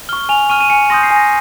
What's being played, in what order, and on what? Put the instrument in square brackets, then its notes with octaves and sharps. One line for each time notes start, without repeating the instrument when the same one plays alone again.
[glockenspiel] C#6 F6 G7
G#5 F7
C#6 F6 D#7
D#7
G#5 C#7
C6 D#6 G6 A#6
C7
G#5
A#6